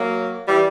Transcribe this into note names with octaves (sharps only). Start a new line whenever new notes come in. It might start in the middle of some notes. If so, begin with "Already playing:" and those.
Already playing: F#3 A#3
E3 G3